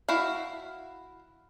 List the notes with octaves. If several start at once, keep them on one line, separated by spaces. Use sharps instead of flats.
E4 F#4 F5